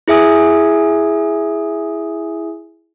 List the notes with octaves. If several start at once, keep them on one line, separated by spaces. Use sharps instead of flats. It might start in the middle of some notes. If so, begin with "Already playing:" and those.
E4 G#4 E5 G#5 D#6